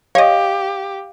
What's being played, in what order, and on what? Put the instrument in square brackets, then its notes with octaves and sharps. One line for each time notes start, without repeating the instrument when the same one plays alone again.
[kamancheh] G4 [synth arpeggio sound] C#5 D#5 [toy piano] F5